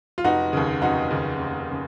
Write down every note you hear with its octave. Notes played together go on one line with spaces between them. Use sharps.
F4
F1 D#4 F#4
D#2 C#3
F1 D#4 F#4
D#2 C#3
F1
C#3